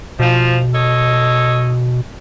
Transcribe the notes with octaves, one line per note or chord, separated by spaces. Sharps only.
B2 F3
A4 C#5 D#5